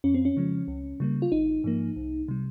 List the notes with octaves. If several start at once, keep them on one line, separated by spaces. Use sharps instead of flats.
F2 C#4
C4
C#4
C#3 F3 G#3
C#2
C#3 G3 A#3
F4
G#1 D#4
G#2 F3 A#3
C2
C3 G3